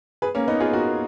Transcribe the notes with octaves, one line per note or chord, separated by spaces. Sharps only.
G#4 B4
A#3 C#4
B3 D#4
F4 G#4
F#4 A#4